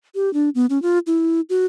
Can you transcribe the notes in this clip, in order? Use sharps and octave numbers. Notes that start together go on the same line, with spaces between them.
G4
D4
B3
C#4
F4
E4
F#4